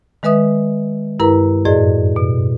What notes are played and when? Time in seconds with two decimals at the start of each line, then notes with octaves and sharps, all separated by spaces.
0.23 D#3 G#3 B4 E5 D#6
1.19 G2 E4 A#4 B4 A#5
1.65 F#2 A2 G#4 D5 D#5
2.16 B2